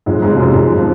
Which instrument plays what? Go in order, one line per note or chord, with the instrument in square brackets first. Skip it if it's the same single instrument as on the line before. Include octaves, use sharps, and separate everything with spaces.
[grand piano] F2 [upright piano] G#2 G#3
[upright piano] G#2 G#3
[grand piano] C3 F3
[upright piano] F#2 F#3
[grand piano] F2
F3